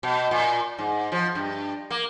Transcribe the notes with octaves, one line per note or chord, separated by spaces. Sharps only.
B2
A#2
G#2
F3
G2
A#3